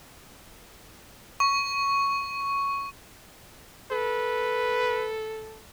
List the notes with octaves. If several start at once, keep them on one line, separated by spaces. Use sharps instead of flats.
C#6
A4 B4